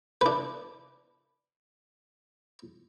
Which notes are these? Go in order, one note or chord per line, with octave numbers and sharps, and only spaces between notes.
D4 B4